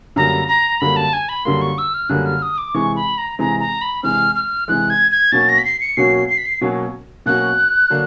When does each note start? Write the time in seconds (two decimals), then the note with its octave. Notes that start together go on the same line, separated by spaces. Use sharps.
0.16 F#2 D3 G3 A#3 A#5
0.48 A#5
0.80 F#2 D3 G3 A#3 B5
0.96 A5
1.13 G#5
1.29 B5
1.45 F#2 D3 G3 A#3 C6
1.62 C#6
1.78 E6
1.94 F6
2.09 F#2 D3 G3 A#3 F#6
2.26 F6
2.42 D#6
2.58 D6
2.74 C3 E3 G#3 C#6
2.96 B5
3.18 A#5
3.39 C3 E3 G#3 A#5
3.60 A#5
3.81 B5
4.03 C3 E3 G#3 F6
4.35 F6
4.68 C3 E3 G#3 F#6
4.90 G#6
5.11 G#6
5.32 B2 F#3 A#3 C#4 F#4 A6
5.49 A#6
5.58 B6
5.65 C7
5.80 C#7
5.97 B2 F#3 A#3 C#4 F#4 C7
6.29 C7
6.38 B6
6.46 C7
6.61 B2 F#3 A#3 C#4 F#4
7.26 B2 F#3 A#3 C#4 F#4 F#6
7.90 D3 F#3 A#3 D4